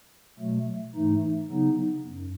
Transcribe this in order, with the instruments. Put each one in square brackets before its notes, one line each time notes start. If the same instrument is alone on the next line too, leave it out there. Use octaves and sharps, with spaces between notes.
[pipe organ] B2 F#3 A3
G#2 E3 A3 D#4
C#3 F#3 B3 D#4
F#2